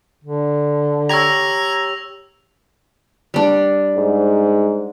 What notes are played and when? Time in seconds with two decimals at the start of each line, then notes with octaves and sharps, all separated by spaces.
0.24 D3
1.09 G4 C#5 A#5 E6 G#6 A#6 F7
3.34 G3 D4
3.96 G#2